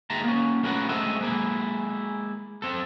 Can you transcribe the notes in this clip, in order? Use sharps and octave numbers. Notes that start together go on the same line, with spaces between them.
D#2 G#3 E5 A5 A#5
A#3 C#4
A3 C#4 F4 A#4 B4 F#5
G#3 A3 C4 D#5 E5
G#3 A#3 E4
C4 A4